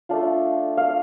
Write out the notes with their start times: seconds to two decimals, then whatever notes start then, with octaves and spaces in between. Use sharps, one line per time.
0.09 A3 D4 F4
0.77 F5